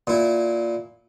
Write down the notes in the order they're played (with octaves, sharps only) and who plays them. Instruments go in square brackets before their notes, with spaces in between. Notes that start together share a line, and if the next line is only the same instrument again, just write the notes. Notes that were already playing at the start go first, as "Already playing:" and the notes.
[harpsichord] A#2 E4